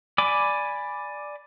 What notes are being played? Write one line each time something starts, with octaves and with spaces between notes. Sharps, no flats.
D5 G#5 B5 D6